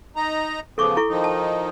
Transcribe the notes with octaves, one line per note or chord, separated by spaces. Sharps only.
D#4 A#5
C#3 F3 B3 A4 C#6 D6
E4 A4 C#6
D#3 F3 D#4
A5